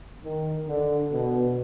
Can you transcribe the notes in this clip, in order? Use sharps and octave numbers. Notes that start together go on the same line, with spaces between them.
D#3
D3
B2